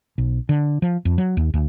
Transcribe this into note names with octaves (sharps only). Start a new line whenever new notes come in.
B1
D3
F3
F2
F#3
D#2
D2